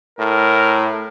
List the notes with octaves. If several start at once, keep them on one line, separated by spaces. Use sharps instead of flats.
A2 A#4